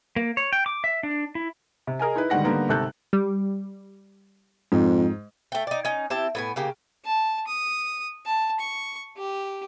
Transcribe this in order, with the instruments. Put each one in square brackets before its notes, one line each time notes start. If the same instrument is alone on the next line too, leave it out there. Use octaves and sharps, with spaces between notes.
[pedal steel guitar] A#3
C#5
G5
D6
E5
D4
E4
[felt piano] C3
G#4 A#4 D#5 G#5
D#4 E4 B4
G#2 D3 D#3 G3 F#5 A#6
D3 G3 A#3 B3 D#4
G#1 C3 A4 F#6 G6
[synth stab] G3
[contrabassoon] F2 [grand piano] G#2
[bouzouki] A3 G5
D#4 D5
C#4 D#4
C4 E4 G4 A5
A2 B3 G#5
C#3 A#3 G4
[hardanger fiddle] A5
D#6
A5
C#6
G4